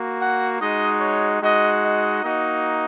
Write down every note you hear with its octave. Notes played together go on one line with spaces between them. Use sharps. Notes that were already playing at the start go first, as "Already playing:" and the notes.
Already playing: A#3 F#4
F#5
G#3 D#4 F#4 D#5
C#5
G#3 D#4 F#4 D#5
D#5
A#3 D#4 F#4